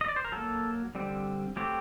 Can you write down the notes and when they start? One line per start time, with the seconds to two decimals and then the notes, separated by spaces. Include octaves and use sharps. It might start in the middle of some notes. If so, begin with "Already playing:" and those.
0.01 D#5
0.08 D5
0.16 C5
0.25 A#4
0.32 F#3 A#3 A4
0.95 D3 G3 C4
1.56 F#3 A3 C4 G4